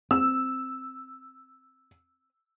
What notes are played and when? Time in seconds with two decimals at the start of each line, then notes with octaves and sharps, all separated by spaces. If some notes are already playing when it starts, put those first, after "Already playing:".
0.11 C4 E6